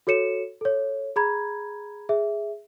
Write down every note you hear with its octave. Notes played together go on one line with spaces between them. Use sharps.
F#4 A4 C#5 C#7 E7
A4 C#5
G#4 A#5 B5 G#6
G#4 E5